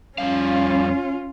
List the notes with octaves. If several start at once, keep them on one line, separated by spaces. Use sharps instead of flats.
F2 G3 C#4 F4 F5